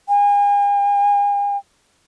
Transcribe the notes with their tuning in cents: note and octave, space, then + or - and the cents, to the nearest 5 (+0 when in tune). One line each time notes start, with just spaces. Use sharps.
G#5 -40